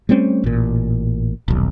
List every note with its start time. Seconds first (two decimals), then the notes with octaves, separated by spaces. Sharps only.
0.09 G3 A3 C4 C#4
0.44 A1 A#2
1.48 D#1 B1